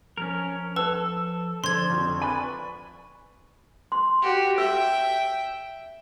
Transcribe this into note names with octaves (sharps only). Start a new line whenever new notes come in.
F3 C#4 A#4
A4 B4 A5 E6
D3 F3 C5 D5 C6 G#6
F2 C#6
B4 D5 G#5 B5
C6
F#4 G4
E5 G5 E6